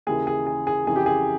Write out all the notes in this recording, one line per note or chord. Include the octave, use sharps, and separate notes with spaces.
D#2 C#3 E3 G#4
G#4
G#4
G#4
F2 C#3 E3 G#4
G4
G#4